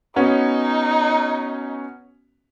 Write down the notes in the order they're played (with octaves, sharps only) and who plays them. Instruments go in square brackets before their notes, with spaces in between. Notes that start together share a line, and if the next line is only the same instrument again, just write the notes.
[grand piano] B3 C#4 F#4 [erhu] D#4